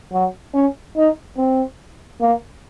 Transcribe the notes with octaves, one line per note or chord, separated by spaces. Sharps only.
F#3
C#4
D#4
C4
A#3